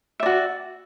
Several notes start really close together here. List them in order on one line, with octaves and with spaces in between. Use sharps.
E5 D5 F#4